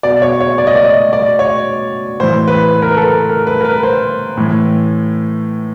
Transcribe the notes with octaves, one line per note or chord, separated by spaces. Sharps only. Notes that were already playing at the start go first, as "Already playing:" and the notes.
B2 D5
C#5
C#5
D5
D#5
D5
D#5
D5
C#5
A2 E3 C5
B4
B4
A#4
B4
A4
A#4
A#4
B4
A#4
B4
C5
A2 E3